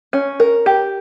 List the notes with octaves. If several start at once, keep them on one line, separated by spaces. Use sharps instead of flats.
C#4
A#4
G4